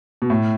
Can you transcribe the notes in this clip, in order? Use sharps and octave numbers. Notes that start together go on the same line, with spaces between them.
B2
A2